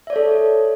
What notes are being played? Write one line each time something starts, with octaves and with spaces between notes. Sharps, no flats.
A4 C#5 D5 E5